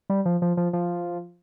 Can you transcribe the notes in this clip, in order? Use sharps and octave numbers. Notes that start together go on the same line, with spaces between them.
G3
F3
F3
F3
F3